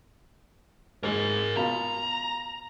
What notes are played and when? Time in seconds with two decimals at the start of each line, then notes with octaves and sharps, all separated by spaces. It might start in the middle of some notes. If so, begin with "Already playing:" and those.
1.03 G#2 G#3 A#4 G#5
1.57 B2 F4 A#5